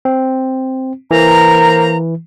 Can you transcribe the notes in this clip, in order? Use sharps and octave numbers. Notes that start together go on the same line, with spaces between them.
C4
E3 A#3 C5 A#5